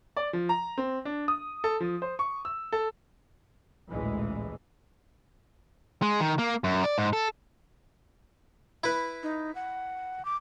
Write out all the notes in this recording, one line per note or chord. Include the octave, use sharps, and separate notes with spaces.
D5
F3
A#5
C4
D4
D#6
A4
F3
C5
C#6
E6
A4
A1 D2 A#2 E3 G#3
G#3
D#3
A#3
F#2
D5
G#2
A4
E4 B4
D#4
F#5
D6